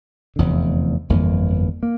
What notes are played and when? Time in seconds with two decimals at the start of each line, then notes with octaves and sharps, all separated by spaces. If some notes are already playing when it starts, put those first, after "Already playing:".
0.36 F1 E2 D3
1.09 G1 F2 E3 A#3
1.83 A#3